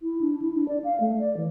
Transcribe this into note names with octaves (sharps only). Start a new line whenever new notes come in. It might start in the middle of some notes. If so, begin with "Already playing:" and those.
E4
D4
E4
D4
D5
F5
A3
D5
E3